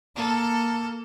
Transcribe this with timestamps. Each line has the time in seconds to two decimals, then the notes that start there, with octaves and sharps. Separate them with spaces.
0.16 A#3 A4